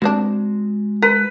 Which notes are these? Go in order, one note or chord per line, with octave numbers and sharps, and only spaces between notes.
G3 G#3 C4 D4 F#4
A#4 B4